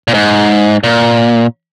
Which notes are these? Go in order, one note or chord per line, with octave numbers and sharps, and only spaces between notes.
A#2
G#2
A#2